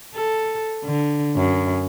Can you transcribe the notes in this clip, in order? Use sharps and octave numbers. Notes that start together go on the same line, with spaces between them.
A4
D3
F#2